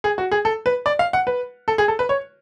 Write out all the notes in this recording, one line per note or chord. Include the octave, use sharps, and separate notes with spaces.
G#4
F#4
G#4
A4
B4
D5
F5
F#5
B4
A4
G#4
A4
B4
C#5